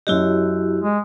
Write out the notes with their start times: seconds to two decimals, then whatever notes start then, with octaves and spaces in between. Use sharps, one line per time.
0.07 F#2 F#3 E4 F#4 G4 D#5
0.81 G#3